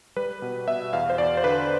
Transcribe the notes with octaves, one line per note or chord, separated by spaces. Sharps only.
G3 B4
B2
B2 E5
E2 F5
C5
E2 D5
C5
D3 B4